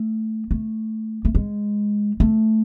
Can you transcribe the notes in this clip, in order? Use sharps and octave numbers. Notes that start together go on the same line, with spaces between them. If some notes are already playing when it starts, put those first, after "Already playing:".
Already playing: A3
A3
A3
G#3
A3